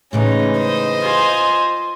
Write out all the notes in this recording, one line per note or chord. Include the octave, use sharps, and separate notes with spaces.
A2 C#3 E3 G#3 C#4 D#4
C5 D#5
F4 G#5